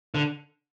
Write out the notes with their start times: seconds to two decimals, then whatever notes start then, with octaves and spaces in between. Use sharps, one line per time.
0.15 D3